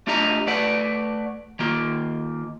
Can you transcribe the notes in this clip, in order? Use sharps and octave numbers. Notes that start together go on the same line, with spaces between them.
A3 D4 F4 G4 D#5 A#5
A3 B4 D5 F#5
D#3 A#3 F4